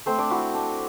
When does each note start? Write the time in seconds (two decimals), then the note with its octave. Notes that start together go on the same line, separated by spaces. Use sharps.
0.06 A3 C4 C5
0.18 D4 D5
0.30 E4 F#4
0.55 D4